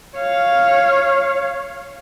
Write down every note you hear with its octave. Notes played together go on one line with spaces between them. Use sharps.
C#5 F5